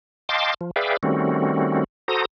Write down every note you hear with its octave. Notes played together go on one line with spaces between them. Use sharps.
D#5 F5 G5 A5 C6 D6
F3
G#4 B4 D5 E5 F5 G5
D#3 G3 A3 C4 C#4 F#4
F#4 A4 C5 A#5 D#6